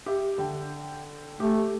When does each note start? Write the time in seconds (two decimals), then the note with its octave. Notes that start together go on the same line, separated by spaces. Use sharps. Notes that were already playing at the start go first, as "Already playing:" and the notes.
0.06 G4 E5
0.38 D3 G5
1.40 A3 G4